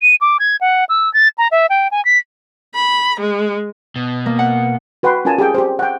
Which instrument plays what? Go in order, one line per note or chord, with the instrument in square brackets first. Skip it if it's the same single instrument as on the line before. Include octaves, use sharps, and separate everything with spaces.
[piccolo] D#7
D6
G#6
F#5
E6
A6
A#5
E5
G5
G#5
B6
[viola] B5
G#3
[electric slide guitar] B2
[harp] A#3
F#5
[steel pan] F#4 B4 F#5 G5 C6
C#4 F4 A#4 G#5 A5
G4 G#4 G5
G4 C5
F#5 G5